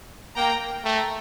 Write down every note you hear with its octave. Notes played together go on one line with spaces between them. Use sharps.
A#3 G5 A#5
A3 G5 A#5